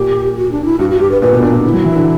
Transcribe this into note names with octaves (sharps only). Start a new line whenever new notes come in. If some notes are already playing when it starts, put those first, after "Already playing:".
Already playing: A#2 G4
F#4
D4
E4
G2 F#4
F#4
G2 G4
B4
A#2 B4
B2
A#2 D4
A#2
D3 E4
F#3
E3
D3